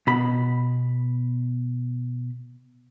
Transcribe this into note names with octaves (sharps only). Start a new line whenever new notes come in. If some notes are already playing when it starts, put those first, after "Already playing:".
B2 B5